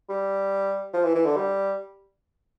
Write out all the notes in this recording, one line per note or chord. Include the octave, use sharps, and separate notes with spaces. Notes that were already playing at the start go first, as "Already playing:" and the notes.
G3
F3
E3
E3
D3
G3